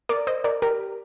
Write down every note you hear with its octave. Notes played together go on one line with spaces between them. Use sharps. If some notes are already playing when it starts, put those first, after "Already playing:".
A#4 D5
C5 D#5
A#4 D5
G4 A#4